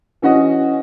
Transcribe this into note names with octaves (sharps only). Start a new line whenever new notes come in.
E3 C#4 F#4 D#5